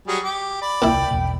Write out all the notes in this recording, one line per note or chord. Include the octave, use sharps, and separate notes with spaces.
F#3 G3 G#4
G4 D6
D5 B5
D#1 C2 A#2 A#3 E4 G5
A#1 E2 B2